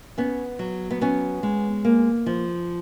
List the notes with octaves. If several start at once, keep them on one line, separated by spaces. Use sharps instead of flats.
B3 C#4
F#3
B3
B3 C#4
G#3
A#3
F3